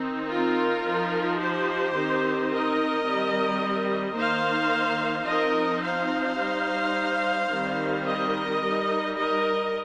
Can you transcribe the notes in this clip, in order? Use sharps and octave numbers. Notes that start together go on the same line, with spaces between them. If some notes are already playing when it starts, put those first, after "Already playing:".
Already playing: D#3 C4 D#4
F4 A#4
F3 D#4
G4 C5
D#3 C4 D#4
A#4 D#5
D#3 G3 C4
D#3 A#3 D#4 C5 F5
F3 C4 D#4 A#4 D#5
C5 F5
G3 D#4
D#3 G3 C4 D#4
A#4 D#5
G3 D#4
A#4 D#5